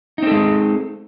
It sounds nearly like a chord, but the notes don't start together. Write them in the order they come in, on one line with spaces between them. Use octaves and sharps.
D#4 C4 A4 G#3